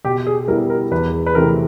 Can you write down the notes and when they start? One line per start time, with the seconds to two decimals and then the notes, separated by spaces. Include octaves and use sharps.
0.05 B2 G4
0.27 G#4
0.48 G3 B3 E4 A#4
0.70 A#4
0.91 E2 B4
1.26 B4
1.35 C3 E3 A3 C4 A#4